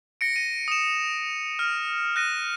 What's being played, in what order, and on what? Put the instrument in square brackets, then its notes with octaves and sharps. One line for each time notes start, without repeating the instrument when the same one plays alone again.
[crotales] A#6 C#7 D7
A#6 D#7
D#6 E7
F6
F#6 A#6 D#7